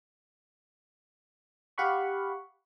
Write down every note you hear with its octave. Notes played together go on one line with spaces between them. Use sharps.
G4 F5 F#5 B5 C#6